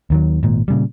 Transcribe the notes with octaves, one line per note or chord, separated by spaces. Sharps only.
D#2 D#3 F#3
G#1 A#2
A#2 C#3 G3